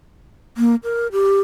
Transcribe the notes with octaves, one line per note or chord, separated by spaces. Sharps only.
A#3
A#4
G4